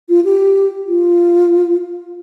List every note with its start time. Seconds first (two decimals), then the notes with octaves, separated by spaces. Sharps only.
0.09 F4
0.25 G4
0.88 F4